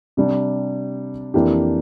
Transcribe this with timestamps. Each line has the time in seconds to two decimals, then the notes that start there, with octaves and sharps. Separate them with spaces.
0.17 C3 G3 D4
1.34 F2 E3 A#3 D4 G4